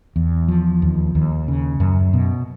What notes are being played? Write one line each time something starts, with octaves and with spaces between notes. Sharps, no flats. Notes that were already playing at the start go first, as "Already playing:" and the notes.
E2
F3
D#2
D#2
C#3
F#2
B2